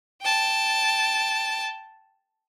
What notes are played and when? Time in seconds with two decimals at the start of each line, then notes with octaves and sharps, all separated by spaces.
0.22 G5 A5